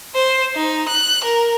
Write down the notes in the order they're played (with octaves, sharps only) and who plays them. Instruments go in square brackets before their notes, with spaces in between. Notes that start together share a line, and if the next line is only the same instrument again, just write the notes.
[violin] C5
D#4
F#6
A#4